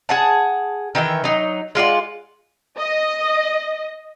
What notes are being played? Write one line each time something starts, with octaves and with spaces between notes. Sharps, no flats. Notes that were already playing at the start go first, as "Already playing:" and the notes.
G#4 F#5 A5
D#3 E3 E5 G5
F#3 D#4
G#3 F4 D5 F#5
D#5